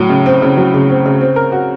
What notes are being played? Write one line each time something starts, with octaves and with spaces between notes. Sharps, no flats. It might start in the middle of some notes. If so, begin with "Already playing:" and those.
Already playing: A2 F#3
C#3
C4
C#3
F#3
C#3
C4
C#3
C4
A#4
F#4